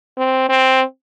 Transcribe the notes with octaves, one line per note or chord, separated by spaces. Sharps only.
C4
C4